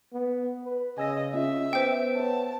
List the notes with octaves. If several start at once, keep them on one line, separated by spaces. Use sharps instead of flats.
B3
B4
C#3 D#5 G#5 E6 A#6
C#4 F4 D#5 E5
B3 C5 G5
B4 C#5 A5